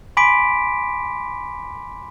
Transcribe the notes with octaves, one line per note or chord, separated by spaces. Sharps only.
G#5 B5 C6 D6 B6 D7